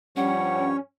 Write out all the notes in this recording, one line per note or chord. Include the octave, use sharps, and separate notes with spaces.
G2 F3 G3 C#4 C#5 F#5